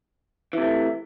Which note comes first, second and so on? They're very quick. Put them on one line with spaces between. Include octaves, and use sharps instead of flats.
E3 C3 A3